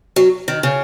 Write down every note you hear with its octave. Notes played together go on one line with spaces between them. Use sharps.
F#3
D#3
C#3